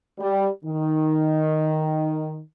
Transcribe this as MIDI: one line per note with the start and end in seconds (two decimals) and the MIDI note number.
0.20 0.49 55
0.65 2.41 51